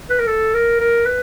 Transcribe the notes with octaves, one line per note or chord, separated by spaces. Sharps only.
B4
A#4
A4
A#4
A#4
B4